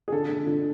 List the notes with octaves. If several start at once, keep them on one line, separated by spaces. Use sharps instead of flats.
G#4
D3 A4
D3
D3